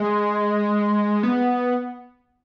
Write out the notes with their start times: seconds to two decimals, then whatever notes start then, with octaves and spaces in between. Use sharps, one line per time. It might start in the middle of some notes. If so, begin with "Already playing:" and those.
Already playing: G#3
1.23 B3